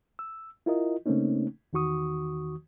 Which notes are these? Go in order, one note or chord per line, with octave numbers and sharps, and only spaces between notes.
E6
E4 F4 A#4 D#5
C#3 A3 A#3 C4 C#4 D#4
E2 D#3 F#4 C#6 D#6